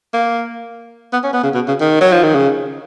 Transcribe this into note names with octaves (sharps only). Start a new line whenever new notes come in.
A#3
B3
C#4
B3
C#3
B2
C#3
D#3
F#3
F3
D#3
C#3